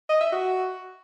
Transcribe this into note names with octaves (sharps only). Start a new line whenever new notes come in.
D#5
E5
F#4